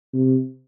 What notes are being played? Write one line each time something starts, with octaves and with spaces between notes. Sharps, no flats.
C3